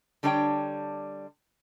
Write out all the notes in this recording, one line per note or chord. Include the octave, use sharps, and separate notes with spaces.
D3 G3 D4 C#5 D#5 G5